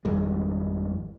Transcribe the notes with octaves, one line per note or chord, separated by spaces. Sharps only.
G#1 F2 G3 G#3